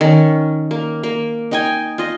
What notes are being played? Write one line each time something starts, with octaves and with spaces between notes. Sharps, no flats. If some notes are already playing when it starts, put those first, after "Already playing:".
D#3 C#4
A#3
A#3
D#4 G5 G#5
F4 D#5